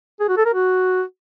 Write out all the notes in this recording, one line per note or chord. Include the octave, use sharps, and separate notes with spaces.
G#4
F#4
A4
A#4
F#4